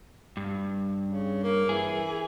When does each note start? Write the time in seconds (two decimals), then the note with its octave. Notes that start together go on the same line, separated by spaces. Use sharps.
0.37 G2
1.05 C#3
1.43 A#3
1.69 E3 G#4